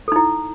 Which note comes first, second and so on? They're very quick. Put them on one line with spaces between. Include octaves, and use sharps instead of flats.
A4 D#4 E4